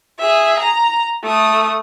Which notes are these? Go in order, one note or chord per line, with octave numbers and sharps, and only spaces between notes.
G#4 E5
A#5
A3 D#6